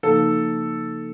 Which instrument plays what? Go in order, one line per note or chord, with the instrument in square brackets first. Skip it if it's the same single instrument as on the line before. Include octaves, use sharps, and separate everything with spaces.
[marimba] C#3 F3 A#3 D#4 [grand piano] A4